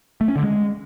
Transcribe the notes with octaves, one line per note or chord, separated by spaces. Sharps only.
A3
C#4
D3
G#3